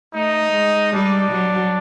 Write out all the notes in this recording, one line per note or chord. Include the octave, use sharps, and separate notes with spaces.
A3 D#4
G#3
G3 D4
F#3